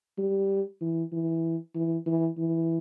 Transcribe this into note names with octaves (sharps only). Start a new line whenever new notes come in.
G3
E3
E3
E3
E3
E3